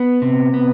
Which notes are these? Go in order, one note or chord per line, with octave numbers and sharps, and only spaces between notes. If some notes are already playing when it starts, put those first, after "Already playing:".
Already playing: B3
C3
B3